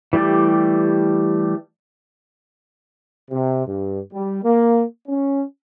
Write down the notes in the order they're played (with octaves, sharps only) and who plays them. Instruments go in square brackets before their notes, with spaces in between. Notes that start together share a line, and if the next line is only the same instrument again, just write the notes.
[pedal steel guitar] E3 G3 A3 G4 D5
[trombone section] C3
G2
G3
A#3
C#4